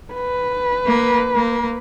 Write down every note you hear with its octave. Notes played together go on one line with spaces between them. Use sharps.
B4
A#3
A#3